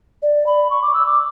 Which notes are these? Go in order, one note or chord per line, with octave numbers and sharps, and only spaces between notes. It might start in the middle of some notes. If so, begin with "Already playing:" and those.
D5
B5
C#6
D6
E6
D6